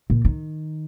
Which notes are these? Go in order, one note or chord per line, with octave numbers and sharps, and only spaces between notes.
A#2
D#3